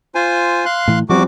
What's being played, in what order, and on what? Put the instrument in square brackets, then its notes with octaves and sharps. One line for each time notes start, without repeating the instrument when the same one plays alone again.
[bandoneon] F4 C5 G#5
F5 C6 F#6
[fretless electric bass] A2 E3
[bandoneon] E2 F#4 D6 [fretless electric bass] F3 G3 C4